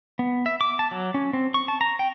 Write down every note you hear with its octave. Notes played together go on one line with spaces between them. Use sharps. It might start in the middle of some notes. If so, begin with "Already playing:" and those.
B3
E5
D6
A5
F#3
C#4
C4
C#6
A5
A#5
G5